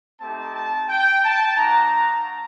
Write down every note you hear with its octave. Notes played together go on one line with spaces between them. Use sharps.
A3 C4 D#4 G4 A5
A5
G5
A5
A#3 D#4 F#4 A#5